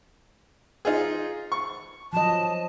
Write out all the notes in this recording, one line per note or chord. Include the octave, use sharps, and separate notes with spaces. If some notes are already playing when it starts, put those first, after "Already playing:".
D#4 F4 G#4
C#6
F3 F#3 D#5 A5